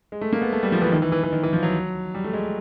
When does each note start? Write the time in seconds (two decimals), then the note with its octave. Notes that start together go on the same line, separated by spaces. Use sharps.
0.12 G#3
0.21 A3
0.33 A#3
0.42 B3
0.53 A3
0.63 G3
0.72 F3
0.82 E3
0.92 D#3
1.02 E3
1.12 E3
1.23 E3
1.33 D#3
1.43 E3
1.53 F3
1.63 F#3
2.14 G3
2.24 A3
2.33 G#3